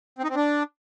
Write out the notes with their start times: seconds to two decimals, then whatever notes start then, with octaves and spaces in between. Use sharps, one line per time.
0.19 C4
0.24 D#4
0.30 C4
0.35 D4